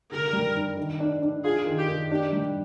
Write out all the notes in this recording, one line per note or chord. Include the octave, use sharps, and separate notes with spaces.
D3 A#4
G3
D4
D#3
D4
D4
F4 G#4
D#3
G4
D#3
D4 G4
G3